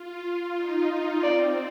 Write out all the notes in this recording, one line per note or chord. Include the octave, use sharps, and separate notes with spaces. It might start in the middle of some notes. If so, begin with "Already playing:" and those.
Already playing: F4
D#4
C4 D5